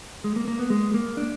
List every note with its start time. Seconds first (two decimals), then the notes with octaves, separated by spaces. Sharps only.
0.24 G#3
0.36 A#3
0.48 A#3
0.59 B3
0.70 G#3
0.94 A#3
1.17 D4